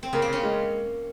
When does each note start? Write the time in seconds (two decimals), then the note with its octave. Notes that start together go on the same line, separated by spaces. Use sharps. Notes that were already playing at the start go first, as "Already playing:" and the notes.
0.03 C4
0.13 C#3 A#3
0.22 C4
0.28 C#3 C#4
0.43 G#3